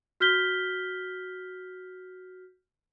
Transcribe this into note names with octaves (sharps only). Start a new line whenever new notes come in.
F#4 F6 G6 B6 G7